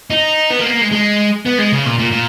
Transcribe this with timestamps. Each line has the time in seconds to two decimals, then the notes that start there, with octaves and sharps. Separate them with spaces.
0.10 D#4
0.50 B3
0.60 A#3
0.66 B3
0.70 A#3
0.81 G#3
0.91 G#3
1.45 B3
1.58 G#3
1.72 C#3
1.86 A#2
1.99 A#2
2.12 A#2